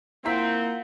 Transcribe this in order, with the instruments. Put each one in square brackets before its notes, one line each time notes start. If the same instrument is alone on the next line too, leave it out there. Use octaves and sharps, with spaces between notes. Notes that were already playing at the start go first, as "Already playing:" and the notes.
[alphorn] A#3 [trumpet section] C4 [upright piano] E4 A#5 B6 [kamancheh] F4 F#5